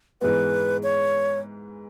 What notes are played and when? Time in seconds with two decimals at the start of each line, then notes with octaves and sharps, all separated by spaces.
0.21 G#2 E3 G#3 B3 B4
0.83 C#5